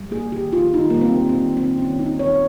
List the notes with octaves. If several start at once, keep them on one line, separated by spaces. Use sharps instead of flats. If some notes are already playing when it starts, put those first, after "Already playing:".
Already playing: G3
A#3 G#4
D#3 G4
D#3 F4
D#3 D#4
G3 A#3
C4
A#3
C4
D#3
D#3 C4
D#3 C#4
A#3 D#4
D#3 C#5